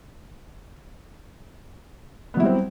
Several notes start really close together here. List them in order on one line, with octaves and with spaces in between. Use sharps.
B3 F#3 E4 G3 C4